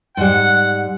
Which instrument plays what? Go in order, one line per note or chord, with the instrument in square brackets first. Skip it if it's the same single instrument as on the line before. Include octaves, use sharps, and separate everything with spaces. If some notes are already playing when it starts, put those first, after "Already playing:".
[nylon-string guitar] G#2 G3 [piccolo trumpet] F#5